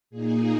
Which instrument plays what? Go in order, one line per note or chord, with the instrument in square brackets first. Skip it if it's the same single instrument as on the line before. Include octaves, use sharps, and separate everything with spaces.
[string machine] A#2 A#3 D#4 G#4